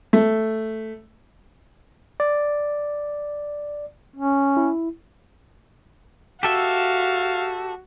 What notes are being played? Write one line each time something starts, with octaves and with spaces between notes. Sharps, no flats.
A3
D5
C#4
E4
F#4 G4 A4 E5 F5